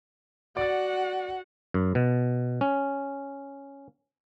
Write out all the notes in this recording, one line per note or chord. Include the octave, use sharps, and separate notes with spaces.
F#4 D5 F#5 A6
F#2
B2
C#4